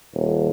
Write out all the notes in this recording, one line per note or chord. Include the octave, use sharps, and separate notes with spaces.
D#1